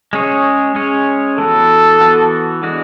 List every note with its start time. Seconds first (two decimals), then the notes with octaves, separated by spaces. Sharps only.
0.13 G#3 C#4 G#4 C#5
0.75 G#3 C#4 G#4 C#5
1.38 E3 B3 F#4 A4
2.01 E3 B3 F#4
2.63 E3 G#3 D4 F#4